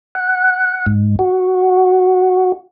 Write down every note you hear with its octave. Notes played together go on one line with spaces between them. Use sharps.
F#5
G#2
F#4